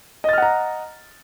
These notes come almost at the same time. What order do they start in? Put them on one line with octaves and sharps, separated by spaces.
D#5 A6 F6 F#5 A#5